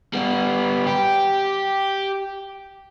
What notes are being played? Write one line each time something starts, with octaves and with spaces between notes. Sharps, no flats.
G3 B3
G4